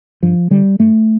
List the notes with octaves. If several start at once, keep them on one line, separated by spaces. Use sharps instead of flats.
G2 F3
D3 G3
G2 A3